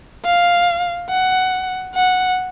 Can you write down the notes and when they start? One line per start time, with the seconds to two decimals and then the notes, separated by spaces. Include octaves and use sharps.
0.25 F5
1.09 F#5
1.95 F#5